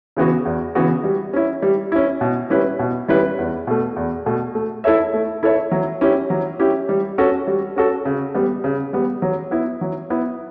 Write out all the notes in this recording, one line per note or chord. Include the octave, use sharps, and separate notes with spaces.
C#3 E3 B3 F#4
E2
C#3 E3 B3 F#4
G3
C#4 E4
G3
C#4 E4
B2
G3 C#4 E4 B4
B2
G3 C#4 E4 B4
E2
B2 A3
E2
B2 A3
A3
E4 A4 C#5 E5
A3
E4 A4 C#5 E5
F#3
C#4 E4 G4
F#3
C#4 E4 G4
G3
C#4 F#4 A4
G3
C#4 F#4 A4
C#3
G3 B3
C#3
G3 B3
F#3
B3 E4
F#3
B3 E4